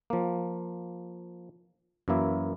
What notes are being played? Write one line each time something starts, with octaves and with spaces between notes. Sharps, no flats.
F3 A#3
F#2 E3 A#3 E4